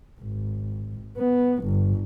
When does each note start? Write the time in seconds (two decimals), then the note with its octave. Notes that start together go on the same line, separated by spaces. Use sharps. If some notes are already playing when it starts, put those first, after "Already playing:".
0.21 G#1
1.17 B3
1.64 G1